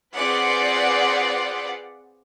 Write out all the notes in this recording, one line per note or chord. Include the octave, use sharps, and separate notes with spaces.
C4 F4 G#4 B4 D5 F#5